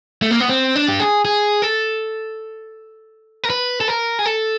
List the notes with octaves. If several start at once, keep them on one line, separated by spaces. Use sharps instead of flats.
A3
A#3
B3
C4
D4
G4
G#4
G#4
A4
A#4
B4
A4
A#4
G#4
A4